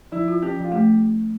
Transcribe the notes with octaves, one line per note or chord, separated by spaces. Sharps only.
F3 E4
F4
C#4 G4
F3
F4
A3 G4